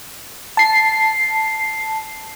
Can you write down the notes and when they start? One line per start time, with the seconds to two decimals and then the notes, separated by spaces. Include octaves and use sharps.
0.57 A5 C7